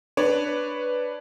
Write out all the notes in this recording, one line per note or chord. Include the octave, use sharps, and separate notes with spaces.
D4 B4 C#5